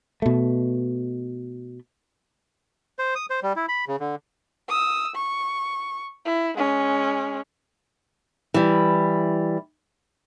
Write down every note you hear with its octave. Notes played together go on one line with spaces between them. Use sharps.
B2 A3
C5
D#6
C5
G3
E4
B5
C#3
D3
D#6 E6
C#6
E4
G#3 C#4
E3 G3